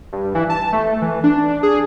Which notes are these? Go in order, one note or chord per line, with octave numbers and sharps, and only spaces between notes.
G2
E3
A5
A3
E3
D4
G#4